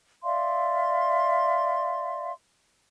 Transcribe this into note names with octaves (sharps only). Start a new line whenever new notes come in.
D5 E5 F5 C6